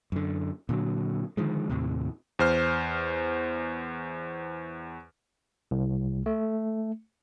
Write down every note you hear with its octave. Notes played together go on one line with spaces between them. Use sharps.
F#2 D3
A#2 D3 D#3 F#3
D3 D#3 F3 G#3
D#2 A2 C3
E2 C5 F6
C2
A3